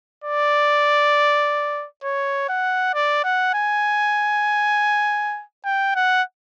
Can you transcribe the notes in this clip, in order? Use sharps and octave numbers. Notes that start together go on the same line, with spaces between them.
D5
C#5
F#5
D5
F#5
G#5
G5
F#5